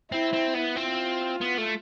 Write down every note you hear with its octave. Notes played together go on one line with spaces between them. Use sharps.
C4 E4
C4
B3
C4 F4
B3
A3